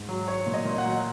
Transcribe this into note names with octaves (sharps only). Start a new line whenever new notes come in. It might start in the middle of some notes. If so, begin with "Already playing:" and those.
Already playing: G#2
F#3
F#3 C#5
A#2
D#5
A#2
F#5
F#3